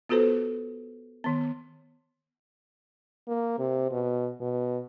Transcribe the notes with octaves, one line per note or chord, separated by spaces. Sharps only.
B3 F4 F#4 A4 B4 C5
D#3 B3
A#3
C3
B2
B2